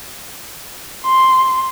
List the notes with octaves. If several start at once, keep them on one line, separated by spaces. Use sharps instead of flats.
C6